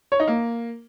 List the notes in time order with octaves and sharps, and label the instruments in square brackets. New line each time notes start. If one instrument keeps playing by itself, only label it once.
[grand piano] C#5
D#4
A#3